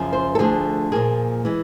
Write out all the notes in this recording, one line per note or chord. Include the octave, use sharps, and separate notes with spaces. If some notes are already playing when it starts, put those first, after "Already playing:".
Already playing: F#2 C#3 F3
C5
A4
D2 D3 F3 A3 G#4
A#2 F3 A#3 G#4
E3 G#3